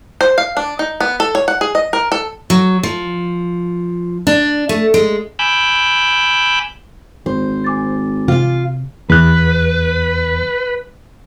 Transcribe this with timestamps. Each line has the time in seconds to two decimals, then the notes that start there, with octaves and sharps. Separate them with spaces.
0.21 C5
0.38 F5
0.57 D4
0.79 D#4
1.01 B3
1.20 A4
1.35 C#5
1.48 F#5
1.61 G#4
1.75 D#5
1.93 A#4
2.12 A4
2.50 F#3
2.83 F3
4.27 D4
4.69 A3
4.94 G#3
5.39 G#5 B5 D6 E6 F#6 G6
7.26 G#1 C5
7.64 G#5 D6 A6
8.28 C3 F4 F5
9.10 E2 B4 F#6